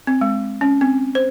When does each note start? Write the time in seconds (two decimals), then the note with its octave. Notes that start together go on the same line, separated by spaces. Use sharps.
0.07 C4
0.21 G#3
0.61 C#4
0.81 C4
1.15 C5